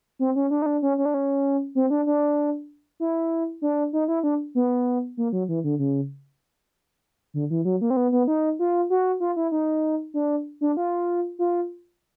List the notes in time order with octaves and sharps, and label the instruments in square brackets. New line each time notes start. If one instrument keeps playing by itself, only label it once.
[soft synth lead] C4
C#4
D4
D#4
D4
C#4
C#4
D4
C#4
C4
D4
D4
E4
D4
D#4
E4
D4
B3
A#3
F#3
E3
D3
C#3
D3
E3
F#3
A#3
C4
B3
B3
D#4
F4
F#4
F4
E4
D#4
D4
D4
F4
F4